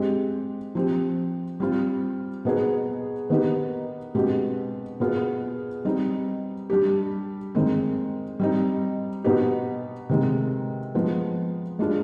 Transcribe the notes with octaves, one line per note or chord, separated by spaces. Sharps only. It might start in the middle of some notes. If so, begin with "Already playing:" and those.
Already playing: G#3 C4 G4
F3 C4 G4
G3 C4 F4
B2 B3 D#4 G#4
D#3 B3 D#4 G4
B2 G#3 C4 G4
B2 B3 F4 G#4
G3 C4 D#4
G3 D4 G4
D#3 G#3 C4
G3 C4 D#4
B2 B3 D#4 G4
C3 D#3 G#3
F3 G#3 B3
G#3 D4 F4 G#4